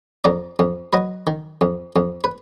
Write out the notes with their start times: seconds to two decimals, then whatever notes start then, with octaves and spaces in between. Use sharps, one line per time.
0.24 F2 A#4 D5
0.59 F2
0.93 F#3 B4 D#5
1.27 D#3
1.61 F2
1.96 F2
2.24 B4